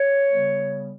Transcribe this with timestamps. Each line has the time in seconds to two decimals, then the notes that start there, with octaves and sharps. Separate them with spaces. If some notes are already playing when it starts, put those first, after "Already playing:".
Already playing: C#5
0.31 C#3 G3 B3